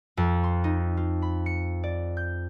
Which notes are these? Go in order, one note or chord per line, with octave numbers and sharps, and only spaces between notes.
F2
C6
D#4
F4
B5
C#7
D5
G6